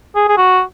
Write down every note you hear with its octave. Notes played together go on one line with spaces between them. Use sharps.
G#4
G#4
F#4